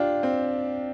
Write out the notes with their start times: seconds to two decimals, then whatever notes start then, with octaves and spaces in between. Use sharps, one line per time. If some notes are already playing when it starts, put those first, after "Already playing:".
Already playing: D4 F4 G4
0.23 C4